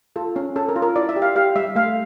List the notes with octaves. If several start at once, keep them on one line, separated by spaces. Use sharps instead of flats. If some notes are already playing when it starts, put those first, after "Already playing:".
F4 A4
C#4
C#4 A4
A#4
F4
A#4
E4 D5
E5
G4
F5
G4 F5
G3 E5
A3 F5